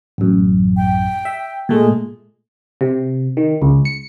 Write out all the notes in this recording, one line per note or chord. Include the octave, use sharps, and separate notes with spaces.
A1 F#2
G5
E5
A#2 G#3 A3
C3
D#3
C#2
C#7